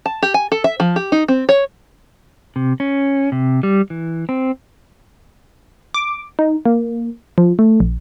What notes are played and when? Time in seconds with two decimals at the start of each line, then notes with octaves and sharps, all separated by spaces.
0.06 A5
0.23 G4
0.34 G#5
0.52 A4
0.64 E5
0.80 F3
0.96 G4
1.12 D#4
1.28 C4
1.49 C#5
2.56 C3
2.80 C#4
3.32 C3
3.63 G3
3.90 E3
4.29 C4
5.94 D6
6.39 D#4
6.65 A#3
7.38 F3
7.59 A3
7.80 A#1